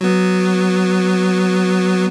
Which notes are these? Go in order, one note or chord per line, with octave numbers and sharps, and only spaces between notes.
F#3 B3